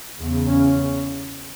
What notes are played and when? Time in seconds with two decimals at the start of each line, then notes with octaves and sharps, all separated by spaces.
0.17 E2 C#3
0.47 C#4